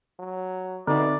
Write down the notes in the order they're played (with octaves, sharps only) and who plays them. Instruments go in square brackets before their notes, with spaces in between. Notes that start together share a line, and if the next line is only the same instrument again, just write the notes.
[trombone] F#3
[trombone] B2 [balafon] D3 [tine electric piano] C4 D#4 E5 [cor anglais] D5